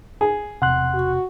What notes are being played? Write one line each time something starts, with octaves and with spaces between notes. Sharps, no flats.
G#4
E1 C3 F#5 C6 F#6
F#4